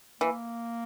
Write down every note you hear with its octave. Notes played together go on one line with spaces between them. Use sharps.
E3 A#3